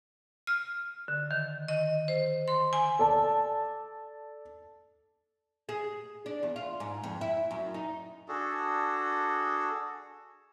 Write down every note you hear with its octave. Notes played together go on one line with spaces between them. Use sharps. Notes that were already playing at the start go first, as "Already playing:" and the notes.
F6
D3
D#3
D#5
C5
C6
G#5
A4 D5 A5
G#4
D4
E2
F4
G#2
F2
E4
F#2
D#4
D4 F#4 G#4 A4